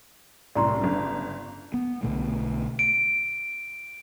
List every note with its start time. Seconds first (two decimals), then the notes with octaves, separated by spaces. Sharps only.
0.56 C2 F#2 A2 D5 A#5 C6
0.80 G1 G2 C#3
1.74 B3
2.03 B1 B2 D3 A3
2.79 D7